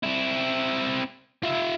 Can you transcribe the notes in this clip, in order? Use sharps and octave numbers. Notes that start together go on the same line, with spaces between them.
C4 E4
F4 E5